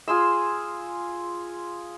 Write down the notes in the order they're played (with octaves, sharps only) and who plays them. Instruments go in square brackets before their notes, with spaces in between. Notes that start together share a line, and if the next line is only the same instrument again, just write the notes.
[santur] F4 G#4 C6 E6